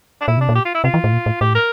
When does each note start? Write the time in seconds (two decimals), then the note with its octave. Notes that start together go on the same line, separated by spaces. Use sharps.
0.21 D4
0.28 A#2 E4
0.37 C3 D4
0.49 A#2
0.55 G4
0.65 F4
0.74 E4
0.84 C3 F4
0.94 E3
1.04 A2
1.13 A#2
1.26 A2
1.41 A2 G4
1.55 A#4